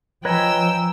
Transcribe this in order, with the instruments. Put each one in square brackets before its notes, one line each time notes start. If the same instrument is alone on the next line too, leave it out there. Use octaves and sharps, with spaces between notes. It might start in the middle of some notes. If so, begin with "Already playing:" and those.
[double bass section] F3 [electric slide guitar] B4 C#5 D#5 [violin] G5 E6 [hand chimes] G#5 A#5